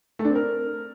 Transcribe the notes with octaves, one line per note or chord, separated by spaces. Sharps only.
A3
D4
C4
A#4